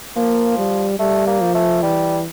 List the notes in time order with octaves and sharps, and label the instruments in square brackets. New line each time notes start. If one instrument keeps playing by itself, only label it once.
[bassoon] F3 [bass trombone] A#3
[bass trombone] G3
[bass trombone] G3 [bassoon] A3
[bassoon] A#3
[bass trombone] F3
[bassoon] A3
[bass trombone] E3 [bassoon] G3